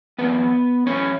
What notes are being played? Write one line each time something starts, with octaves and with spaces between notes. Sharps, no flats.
F#2 E3 B3 B4
F#2 E3 C#4 C#5